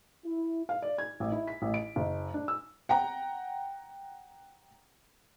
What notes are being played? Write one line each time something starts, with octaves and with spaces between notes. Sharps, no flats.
E4
F5
D5
G#6
A1
E4
B6
A1
D7
F#1
D4
E6
F#5 G5 A#5